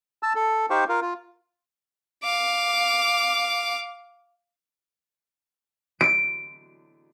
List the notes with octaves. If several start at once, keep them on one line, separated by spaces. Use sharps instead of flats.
A5 E6
A4
D#4 G4 C5 F5 G5 C#6
F4 A#4 F5
F4
F5 D6
D7